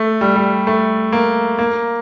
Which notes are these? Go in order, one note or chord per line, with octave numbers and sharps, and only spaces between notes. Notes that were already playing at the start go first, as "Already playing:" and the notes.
Already playing: A3
G3
G3
A3
A#3
A#3